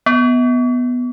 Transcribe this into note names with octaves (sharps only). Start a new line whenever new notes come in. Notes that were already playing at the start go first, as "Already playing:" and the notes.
B3